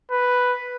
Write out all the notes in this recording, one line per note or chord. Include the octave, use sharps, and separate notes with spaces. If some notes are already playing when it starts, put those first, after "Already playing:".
B4